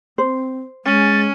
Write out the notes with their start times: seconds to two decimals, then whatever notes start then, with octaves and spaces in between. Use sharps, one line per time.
0.18 C4 C5
0.85 G#3 C#4 A6